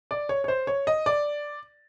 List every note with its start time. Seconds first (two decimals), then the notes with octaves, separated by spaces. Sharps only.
0.11 D5
0.29 C#5
0.44 C#5
0.48 C5
0.67 C#5
0.87 D#5
1.06 D5